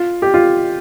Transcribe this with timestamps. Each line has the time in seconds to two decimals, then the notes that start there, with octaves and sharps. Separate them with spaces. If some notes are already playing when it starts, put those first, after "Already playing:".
Already playing: F4
0.22 G4
0.34 F4